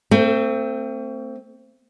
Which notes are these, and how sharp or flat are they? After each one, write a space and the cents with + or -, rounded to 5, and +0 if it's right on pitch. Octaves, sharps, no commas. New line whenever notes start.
A3 +40 C4 +0